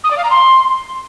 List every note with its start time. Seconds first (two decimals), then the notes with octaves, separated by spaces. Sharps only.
0.04 D#6
0.10 D5
0.17 F5
0.24 A#5
0.30 C6